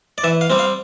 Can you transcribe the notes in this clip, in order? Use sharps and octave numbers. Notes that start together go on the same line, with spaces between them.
D5
E3 E5
F5
G3 C4
F5